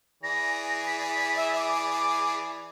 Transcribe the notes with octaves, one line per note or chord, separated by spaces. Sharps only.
E3 G#4 D5 A#6
B6
E5
D6